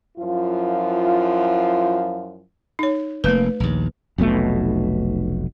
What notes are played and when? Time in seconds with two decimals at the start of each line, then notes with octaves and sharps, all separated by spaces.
0.18 F#2 F3 E4 F4
2.79 D#4 C#5
3.24 F1 A3 A#3 B4
3.60 A#1 D#2
4.18 F1 B1 B2 A3